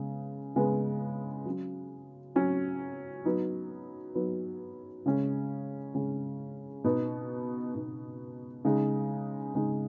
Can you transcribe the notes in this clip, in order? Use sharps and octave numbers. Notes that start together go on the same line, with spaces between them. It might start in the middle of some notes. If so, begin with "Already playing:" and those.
Already playing: C#3 G#3 B3
C#3 G#3 B3
F#3 C#4
F#3 C#4
F#3 B3 D#4
F#3 B3 D#4
C#3 G#3 C#4
C#3 G#3 C#4
B2 B3 D#4
B2 B3 D#4
C#3 G#3 D#4
C#3 G#3 D#4